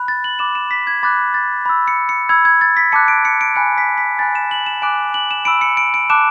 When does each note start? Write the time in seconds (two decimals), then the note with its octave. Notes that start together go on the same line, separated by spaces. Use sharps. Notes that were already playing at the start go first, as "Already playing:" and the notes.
Already playing: B5 F#6
0.08 A6
0.24 F#7
0.39 B5 D6 F#6 E7
0.55 E7
0.71 B6
0.87 G#6
1.03 B5 D6 F#6 A6
1.34 A6
1.66 B5 E6
1.88 C#7
2.09 C#7
2.29 B5 E6 G#6
2.45 G#6
2.61 A6
2.77 B6
2.92 A5 D6 F#6 C#7
3.08 D7
3.25 C#7
3.41 D7
3.55 G#5 B5 F#6 C#7
3.78 B6
3.98 B6
4.19 G#5 B5 F#6 A6
4.35 E7
4.51 F#7
4.66 E7
4.82 G#5 D6 F#6 D7
5.14 F#7
5.31 E7
5.45 B5 E6 D7
5.61 C#7
5.77 D7
5.94 D7
6.10 A5 D6 F#6 E7